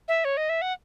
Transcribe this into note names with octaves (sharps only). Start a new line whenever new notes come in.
E5
C#5
D#5
E5
F#5